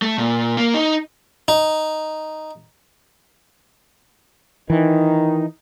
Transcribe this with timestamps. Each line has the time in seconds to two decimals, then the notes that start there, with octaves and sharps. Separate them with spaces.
0.02 A3
0.18 A#2
0.57 A#3
0.74 D#4
1.48 D#4
4.70 D#3 E3 D#4